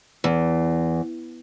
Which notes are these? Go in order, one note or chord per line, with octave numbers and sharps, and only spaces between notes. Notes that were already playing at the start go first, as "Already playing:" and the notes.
E2